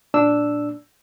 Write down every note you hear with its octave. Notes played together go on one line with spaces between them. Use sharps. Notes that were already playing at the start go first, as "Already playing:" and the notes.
A#2 D4 E6